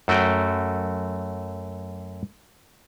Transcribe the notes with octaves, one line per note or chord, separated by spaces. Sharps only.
F#2 A3 F#4 G5